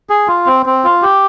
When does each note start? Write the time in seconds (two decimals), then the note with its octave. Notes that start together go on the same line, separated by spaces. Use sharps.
0.10 G#4
0.28 F4
0.46 C4
0.66 C4
0.84 F4
1.02 G4